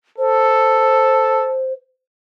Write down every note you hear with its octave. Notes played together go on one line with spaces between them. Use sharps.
A4 C5